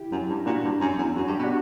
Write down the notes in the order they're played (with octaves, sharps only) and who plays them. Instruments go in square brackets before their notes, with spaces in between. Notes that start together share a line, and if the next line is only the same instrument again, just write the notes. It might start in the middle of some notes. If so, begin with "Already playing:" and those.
Already playing: [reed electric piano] E4 G4
[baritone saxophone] F#2
G2
[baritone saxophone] A#2 [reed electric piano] D4 F#4
[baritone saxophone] G2
F#2
E2
[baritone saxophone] F#2 [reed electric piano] F#4
[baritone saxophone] G2
[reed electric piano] G4
[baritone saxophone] B2
[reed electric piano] D4 F#4